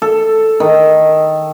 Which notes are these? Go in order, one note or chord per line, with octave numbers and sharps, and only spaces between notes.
A4
D#3